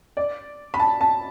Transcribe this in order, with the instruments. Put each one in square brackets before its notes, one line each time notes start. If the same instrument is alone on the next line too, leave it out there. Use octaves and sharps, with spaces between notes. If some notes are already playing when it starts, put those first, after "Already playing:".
[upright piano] D5
B5
A5
A5